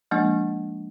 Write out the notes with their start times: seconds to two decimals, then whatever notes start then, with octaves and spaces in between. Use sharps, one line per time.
0.11 F3 G#3 A#3 D4